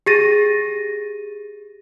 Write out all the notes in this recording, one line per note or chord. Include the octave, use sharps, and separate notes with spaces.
G4 G#4 A6 A#6 D#7